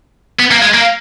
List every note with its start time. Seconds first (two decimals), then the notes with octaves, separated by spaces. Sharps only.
0.39 B3
0.51 A#3
0.62 G#3
0.74 A#3